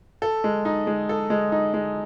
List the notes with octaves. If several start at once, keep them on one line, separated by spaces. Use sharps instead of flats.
A4
G#3
D#4
G#3
A4
G#3
D#4
G#3